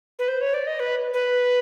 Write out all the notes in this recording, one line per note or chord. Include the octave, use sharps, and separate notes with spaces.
B4
C5
C#5
D5
D#5
B4
B4